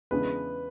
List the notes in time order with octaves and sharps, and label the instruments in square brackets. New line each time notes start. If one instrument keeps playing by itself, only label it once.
[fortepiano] E2 C#3 G#3 B3 D4 [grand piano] B4